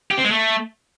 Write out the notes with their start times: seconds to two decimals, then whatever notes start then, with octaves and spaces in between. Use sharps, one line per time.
0.11 G4
0.18 C4
0.24 G#3
0.31 A3